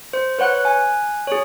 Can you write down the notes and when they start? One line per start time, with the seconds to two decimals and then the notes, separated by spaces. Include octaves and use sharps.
0.13 C5
0.39 B4 C#5 F#5 F#6
0.65 G#5 F#6
1.27 G#4 C#5